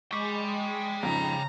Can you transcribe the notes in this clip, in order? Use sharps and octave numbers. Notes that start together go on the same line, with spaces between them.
G#3 G5 B5 C#6 D6
F2 G#2 C#3 A#5